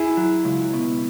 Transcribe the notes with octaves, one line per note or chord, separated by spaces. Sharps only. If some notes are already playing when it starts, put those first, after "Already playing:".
Already playing: E4 G#4
F#3
C#2
B2